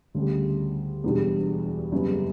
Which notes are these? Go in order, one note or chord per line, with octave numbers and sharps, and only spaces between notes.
D2 C#3 G3
E1 E2 B2 G3 D4
F#1 F#2 C#3 G3 B3